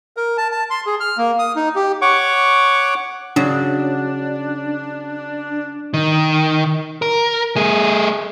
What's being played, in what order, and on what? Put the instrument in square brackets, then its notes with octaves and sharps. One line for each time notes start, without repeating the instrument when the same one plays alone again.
[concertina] A#4
A5
A5
C6
G#4
F6
A#3
D#6
D#4
G4
C#5 F#5 C#6 D6
[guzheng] C#3 F#3 [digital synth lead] D4
[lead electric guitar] D#3
A#4
A3 G#4